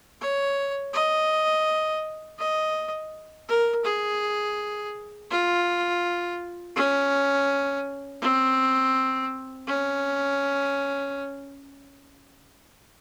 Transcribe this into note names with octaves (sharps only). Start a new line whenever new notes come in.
C#5
D#5
D#5
A#4
G#4
F4
C#4
C4
C#4